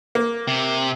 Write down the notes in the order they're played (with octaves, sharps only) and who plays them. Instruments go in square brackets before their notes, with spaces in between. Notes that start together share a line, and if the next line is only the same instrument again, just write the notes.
[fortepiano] A#3
[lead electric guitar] C3